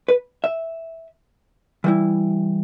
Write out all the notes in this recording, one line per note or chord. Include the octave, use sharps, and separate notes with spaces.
B4
E5
E3 G3 E4